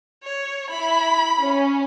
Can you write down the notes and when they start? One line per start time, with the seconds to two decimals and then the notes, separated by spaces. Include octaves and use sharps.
0.24 C#5
0.70 E4 B5
1.41 C#4